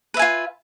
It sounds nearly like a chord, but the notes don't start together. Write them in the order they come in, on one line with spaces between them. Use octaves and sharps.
B4 E5 G#5 F4